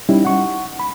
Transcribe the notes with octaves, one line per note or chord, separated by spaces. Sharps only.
G3 C#4 D#4 E4
F#5 C#6
B5